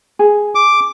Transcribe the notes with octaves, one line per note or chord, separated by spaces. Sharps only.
G#4
D6